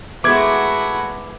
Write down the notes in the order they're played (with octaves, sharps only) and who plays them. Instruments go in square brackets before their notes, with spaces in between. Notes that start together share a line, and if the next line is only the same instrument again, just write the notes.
[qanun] G#3 B3 [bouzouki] A3 [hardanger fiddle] E4 F#4 [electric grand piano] D6 G#6